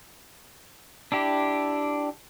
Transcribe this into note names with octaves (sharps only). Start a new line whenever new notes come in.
D4 E4 G4